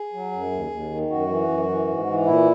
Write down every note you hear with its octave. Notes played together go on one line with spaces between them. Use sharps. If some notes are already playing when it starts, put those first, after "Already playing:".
Already playing: G#4
F#3
F#2
D#2
D#2
D#3
F#2 F#4
E3
F#2
E3
G#2
E3
A#2 E4